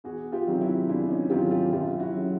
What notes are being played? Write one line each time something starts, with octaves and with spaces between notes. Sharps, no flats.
E2 F#4 G#4
F4 G4
C3 D#3 F#3
E4 F#4
E2 D4 E4
C#4 D#4
C3 D#3 F#3 F4 G4
F4 G4
F#2 F4 G4
E4 F#4
C#3 F#3